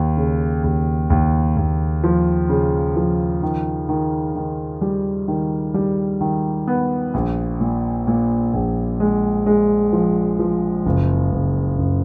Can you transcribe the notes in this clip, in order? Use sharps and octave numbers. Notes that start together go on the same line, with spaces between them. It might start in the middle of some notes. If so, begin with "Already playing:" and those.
Already playing: D#2
C#3
D#2
D#2
D#2
F3
C#3
F3
D#3
D#3
D#3
G3
D#3
G3
D#3
B3
A#1
A#2
A#2
A#1
G#3
G#3
F3
F3
F#1
F#1
F#1